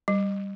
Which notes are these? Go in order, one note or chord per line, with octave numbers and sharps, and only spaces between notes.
G3